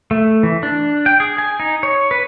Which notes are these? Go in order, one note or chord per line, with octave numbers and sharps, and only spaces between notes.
A3
E3
D4
G5
G#4
G#5
D#4
C#5
B4